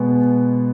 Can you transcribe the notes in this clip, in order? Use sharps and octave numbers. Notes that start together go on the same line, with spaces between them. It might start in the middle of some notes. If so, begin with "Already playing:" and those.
Already playing: B2 G#3 B3